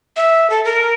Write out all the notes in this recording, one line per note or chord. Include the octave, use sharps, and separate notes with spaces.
E5
A4
A#4